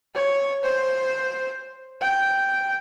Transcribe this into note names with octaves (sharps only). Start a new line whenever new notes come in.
C#5
C5
G5